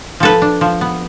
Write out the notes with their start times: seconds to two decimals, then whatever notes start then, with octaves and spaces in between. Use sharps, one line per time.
0.20 F3 A4 B4
0.42 D4
0.61 F3
0.81 B3